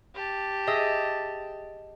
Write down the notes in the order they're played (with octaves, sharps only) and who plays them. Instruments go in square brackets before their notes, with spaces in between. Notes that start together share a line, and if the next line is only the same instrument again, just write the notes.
[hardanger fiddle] G4 A5
[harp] G#4 D#5 E5